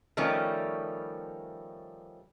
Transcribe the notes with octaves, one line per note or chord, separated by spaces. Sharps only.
D#3 F3 G3 A3 C#4